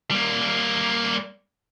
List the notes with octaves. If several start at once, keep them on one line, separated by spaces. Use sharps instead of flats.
G3 A#3